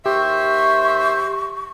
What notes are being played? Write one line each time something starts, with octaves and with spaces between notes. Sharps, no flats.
D#2 G4 C5 E5 C#6